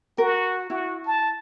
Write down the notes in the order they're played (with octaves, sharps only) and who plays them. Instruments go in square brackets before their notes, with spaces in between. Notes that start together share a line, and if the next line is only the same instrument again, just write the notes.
[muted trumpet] F#4 [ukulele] A#4
[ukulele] E4 [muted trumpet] F#4
[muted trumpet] A5